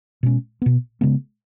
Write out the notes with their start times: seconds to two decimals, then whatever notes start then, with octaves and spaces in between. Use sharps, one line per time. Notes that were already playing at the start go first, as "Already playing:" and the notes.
0.23 B2 G#3 C#4
0.62 B2 B3
1.01 C#3 G#3 B3